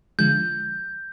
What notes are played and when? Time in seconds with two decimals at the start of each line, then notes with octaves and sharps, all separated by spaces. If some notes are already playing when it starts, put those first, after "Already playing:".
0.19 D3 F3 G#3 G6